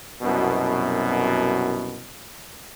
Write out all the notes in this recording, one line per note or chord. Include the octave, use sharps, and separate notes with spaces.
C2 F#2 B2